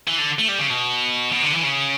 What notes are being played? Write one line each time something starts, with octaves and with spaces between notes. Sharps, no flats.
E3
D3
A3
G3
C#3
B2
B2
D3
E3
C#3